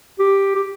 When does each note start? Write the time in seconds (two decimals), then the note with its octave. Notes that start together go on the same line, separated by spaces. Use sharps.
0.19 G4
0.55 G4